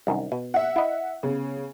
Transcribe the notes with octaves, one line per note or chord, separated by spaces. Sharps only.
C2 F#2 D#3
B2
E5 F#5
E4 D#5
C#3 B3